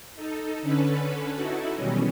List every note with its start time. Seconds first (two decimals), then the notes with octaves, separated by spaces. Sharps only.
0.16 D#4 A4
0.62 D3 C#4 A4 B4
1.35 D#4 E4 F#4 A4
1.77 B2 D#3 E3 F#3 G3 C#4